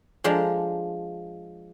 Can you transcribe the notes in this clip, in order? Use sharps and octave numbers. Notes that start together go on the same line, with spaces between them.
F3 G#3 D4 A#5